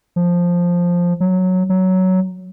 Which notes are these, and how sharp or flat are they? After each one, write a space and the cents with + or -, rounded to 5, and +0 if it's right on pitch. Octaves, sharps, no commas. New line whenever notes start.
F3 +5
F#3 -5
F#3 +10